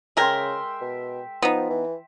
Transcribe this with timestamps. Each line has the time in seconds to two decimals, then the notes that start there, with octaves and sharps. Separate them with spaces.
0.17 C#3 G#3 A#4 E5 G5 C6
0.81 B2
1.42 F3 B3 D#4
1.70 E3